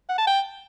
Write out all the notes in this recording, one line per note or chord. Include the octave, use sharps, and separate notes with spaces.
F#5
A5
G5